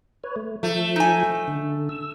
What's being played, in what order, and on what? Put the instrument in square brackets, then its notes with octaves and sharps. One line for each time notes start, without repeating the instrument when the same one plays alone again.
[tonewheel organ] B4 C#5
A3
[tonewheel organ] F3 [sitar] A3
[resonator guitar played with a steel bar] D#4 G#5
[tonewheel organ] D3
E6